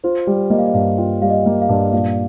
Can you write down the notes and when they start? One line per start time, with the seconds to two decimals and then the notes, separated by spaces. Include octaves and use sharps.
0.04 F4 C5
0.27 G3
0.50 A#3 D#5
0.58 F5
0.66 D#5
0.74 G2 F5
0.98 F4 G5
1.22 G3 F5
1.30 D#5
1.46 A#3
1.62 F5
1.69 G2
1.93 A#2 F5